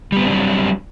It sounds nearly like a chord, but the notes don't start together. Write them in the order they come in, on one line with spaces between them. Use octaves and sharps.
G3 B3 C4 D4 F#3